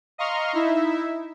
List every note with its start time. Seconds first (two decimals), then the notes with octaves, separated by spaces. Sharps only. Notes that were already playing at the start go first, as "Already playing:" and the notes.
0.18 D#5 F5 A#5 C6 C#6 F6
0.53 D#4 E4 E5